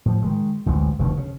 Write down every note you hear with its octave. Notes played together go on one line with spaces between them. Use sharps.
A2 F3
D#3 E3 G#3
A1 D2 E3 G#3
F1 D2 B2 D#3
C#3